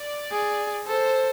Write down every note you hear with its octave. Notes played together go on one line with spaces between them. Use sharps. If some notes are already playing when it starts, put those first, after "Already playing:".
Already playing: D5
G#4
A4 C5